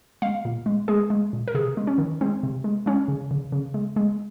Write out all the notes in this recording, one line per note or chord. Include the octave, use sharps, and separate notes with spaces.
G#3 F5
A#2
G#3
G#3 G#4
G#3
A#2
A#4
C3 G#4
G#3
C#4
D#3
G#3 C4
C3
G#3
G#3 C#4
C#3
C#3
C#3
G#3
G#3